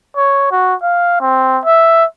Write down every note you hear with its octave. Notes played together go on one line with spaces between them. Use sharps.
C#5
F#4
F5
C4
E5